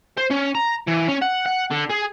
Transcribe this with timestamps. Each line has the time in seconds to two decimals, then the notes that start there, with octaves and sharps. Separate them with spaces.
0.18 C5
0.31 C#4
0.55 A#5
0.87 E3
1.08 C#4
1.21 F#5
1.46 F#5
1.71 D3
1.89 G#4